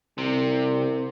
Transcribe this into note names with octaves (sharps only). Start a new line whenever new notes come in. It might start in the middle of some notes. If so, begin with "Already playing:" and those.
C2 C3